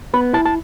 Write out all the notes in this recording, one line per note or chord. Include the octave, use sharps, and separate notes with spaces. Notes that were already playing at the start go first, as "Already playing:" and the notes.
B3 B5
E4 A5
A5